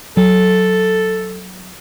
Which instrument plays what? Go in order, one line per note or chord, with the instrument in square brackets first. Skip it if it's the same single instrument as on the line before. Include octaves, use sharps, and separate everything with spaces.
[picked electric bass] F#3 [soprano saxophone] A4